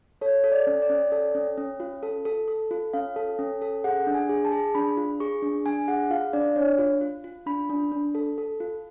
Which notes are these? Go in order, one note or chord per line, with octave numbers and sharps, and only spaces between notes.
A4 C#5
A4
D5
C#4
D5
C#4
A4
C#4
C#4
F4
A4
A4
A4
F4
C#4 F5
A4
C#4
A4
G#4 F#5
D4
G#5
G#4
A5
G#4
D4 B5
F4
G#4 C#6
D4
D4 G#5
G#4 F#5
F4 F5
D4 D5
D4 C#5
F4
F4
F4
D4 B5
D4
D4
A4
A4
F4